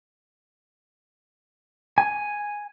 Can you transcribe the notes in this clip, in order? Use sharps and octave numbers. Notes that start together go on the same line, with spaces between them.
G#5